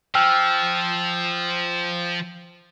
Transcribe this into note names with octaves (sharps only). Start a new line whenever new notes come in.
F3 G5 E6 F6